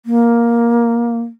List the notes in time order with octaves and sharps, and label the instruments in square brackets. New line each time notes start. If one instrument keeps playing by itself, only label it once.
[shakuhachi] A#3